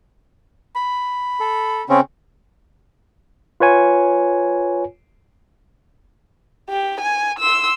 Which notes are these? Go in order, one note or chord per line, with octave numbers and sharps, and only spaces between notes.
B5
A4
C#3 C4 C#4
F4 B4 C#5 G#5
G4
G#5
C6 E6